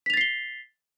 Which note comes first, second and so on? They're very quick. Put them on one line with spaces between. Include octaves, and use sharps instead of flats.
B6 F7 A6 C7 G7